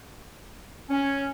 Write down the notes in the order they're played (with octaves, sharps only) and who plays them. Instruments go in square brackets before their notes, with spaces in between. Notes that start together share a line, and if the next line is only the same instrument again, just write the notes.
[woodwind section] C#4